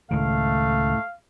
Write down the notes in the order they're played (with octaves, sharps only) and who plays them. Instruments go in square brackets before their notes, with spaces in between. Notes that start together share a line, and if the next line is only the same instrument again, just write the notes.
[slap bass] C#2 D#3 [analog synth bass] A2 [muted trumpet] A3 [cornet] F5